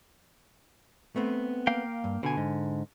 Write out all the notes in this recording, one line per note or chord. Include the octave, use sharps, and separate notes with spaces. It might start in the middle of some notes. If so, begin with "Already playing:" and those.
A3 B3 C4
A#3 F5 G5
G2
B2 D3 G#5
G#2